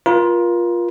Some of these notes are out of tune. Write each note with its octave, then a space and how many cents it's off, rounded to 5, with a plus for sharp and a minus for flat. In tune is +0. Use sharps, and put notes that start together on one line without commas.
F4 +0 A#4 +35